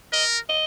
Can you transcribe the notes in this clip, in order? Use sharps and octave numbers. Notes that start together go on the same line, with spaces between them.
A#4 D#5
D#5